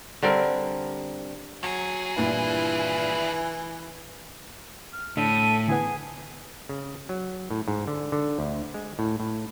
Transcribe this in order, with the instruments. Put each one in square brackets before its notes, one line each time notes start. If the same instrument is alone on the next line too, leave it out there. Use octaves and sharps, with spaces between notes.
[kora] D3 G3 C4 A#4
[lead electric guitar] D#2 G#4 [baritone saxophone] F#3
[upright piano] G2 A#2 [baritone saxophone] E3 [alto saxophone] E4
[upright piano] G#5
[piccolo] F6
[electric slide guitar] A2 [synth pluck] D3 [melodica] A4 E5 [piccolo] D#7
[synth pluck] D3 E3 B3 [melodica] G#4 [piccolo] G#5
[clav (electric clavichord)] C#3
F#3
A2
G#2
D3
D3
D2
G#3
A2
A2